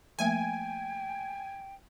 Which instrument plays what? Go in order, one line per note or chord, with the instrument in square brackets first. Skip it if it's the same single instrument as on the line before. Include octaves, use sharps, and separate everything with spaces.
[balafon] F3 A3 A#3 [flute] G5 [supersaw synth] G#5